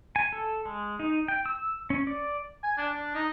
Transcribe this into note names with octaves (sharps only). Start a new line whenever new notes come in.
G#5
A4
G#3
D#4
G5
E6
C#4
D5
G#5
D4
D4
D#4